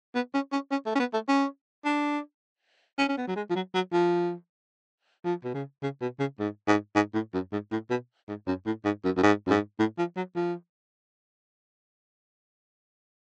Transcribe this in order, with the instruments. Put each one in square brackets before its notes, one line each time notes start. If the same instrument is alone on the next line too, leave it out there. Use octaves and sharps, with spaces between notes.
[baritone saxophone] B3
C#4
C#4
C#4
A3
C#4
B3
A3
C#4
D4
C#4
C#4
B3
F#3
G#3
F3
F#3
F#3
F3
F3
B2
C#3
C#3
B2
C#3
G#2
G#2
G#2
A2
F#2
G#2
A2
B2
G#2
F#2
A2
G#2
F#2
F#2
G#2
F#2
G#2
A2
F3
F#3
F3